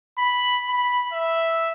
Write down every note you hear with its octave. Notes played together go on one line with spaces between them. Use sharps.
B5
B5
E5